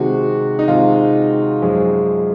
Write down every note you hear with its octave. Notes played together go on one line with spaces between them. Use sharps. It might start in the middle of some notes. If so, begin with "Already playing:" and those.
Already playing: C3 D#3 G#3 F#4
D#4
C3 D#3 G#3 F4
F#2 F3 G#3